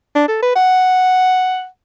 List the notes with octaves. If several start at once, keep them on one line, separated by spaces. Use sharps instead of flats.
D4
A4
B4
F#5